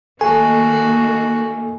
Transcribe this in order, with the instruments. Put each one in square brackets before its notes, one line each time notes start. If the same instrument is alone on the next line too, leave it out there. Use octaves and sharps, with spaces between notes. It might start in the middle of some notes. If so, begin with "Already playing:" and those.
[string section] D#3 A3 A#3 [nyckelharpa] F#4 [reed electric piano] A4 [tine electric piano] G#5